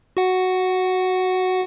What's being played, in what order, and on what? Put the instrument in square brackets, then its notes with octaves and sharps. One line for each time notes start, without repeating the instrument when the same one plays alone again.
[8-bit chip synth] F#4 F#5